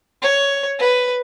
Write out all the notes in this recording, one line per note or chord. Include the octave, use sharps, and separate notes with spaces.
C#5
B4